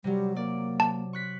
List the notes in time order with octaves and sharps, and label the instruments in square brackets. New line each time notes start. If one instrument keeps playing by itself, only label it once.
[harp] C3 F#3 [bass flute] G3
[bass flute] A#3 [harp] D5
[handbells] A5
[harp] C#6 F#6 B6